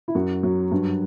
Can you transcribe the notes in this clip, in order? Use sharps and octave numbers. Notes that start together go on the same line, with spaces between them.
E4
F#2 F#4
F#3
G2